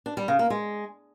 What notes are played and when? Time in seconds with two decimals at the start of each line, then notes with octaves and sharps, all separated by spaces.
0.06 D4
0.17 G3
0.28 C#3
0.39 A#3
0.50 G#3